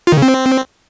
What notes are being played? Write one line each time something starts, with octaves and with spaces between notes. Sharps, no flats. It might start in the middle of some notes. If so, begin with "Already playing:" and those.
F4
D#3
C#3
C4